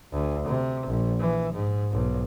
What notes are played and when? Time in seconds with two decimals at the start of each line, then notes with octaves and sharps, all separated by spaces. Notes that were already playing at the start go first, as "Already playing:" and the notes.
0.13 D2
0.48 C3
0.87 A#1
1.20 E3
1.54 G#2
1.91 B1